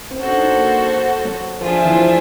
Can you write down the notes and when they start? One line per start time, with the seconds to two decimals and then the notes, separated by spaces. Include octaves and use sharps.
0.11 C4
0.19 C#4 F#4 A4 C5
0.28 D4
0.37 D#4
0.46 D4
0.55 A#3
1.25 F#3
1.61 F3 D4 F4 G#4 C5 E5
1.85 E3
1.96 F3